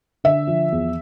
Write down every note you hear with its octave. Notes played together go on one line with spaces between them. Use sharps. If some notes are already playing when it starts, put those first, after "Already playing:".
D3 E5
F3
E2